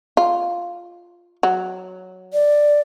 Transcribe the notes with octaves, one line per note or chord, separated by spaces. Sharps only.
F4
F#3
D5